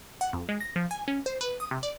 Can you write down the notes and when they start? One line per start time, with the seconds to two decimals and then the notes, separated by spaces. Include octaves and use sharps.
0.21 F#5
0.33 F2
0.49 G#3
0.60 A#6
0.76 F3
0.91 G#5
1.08 C#4
1.26 C5
1.41 B4
1.60 D#6
1.71 C3
1.83 D5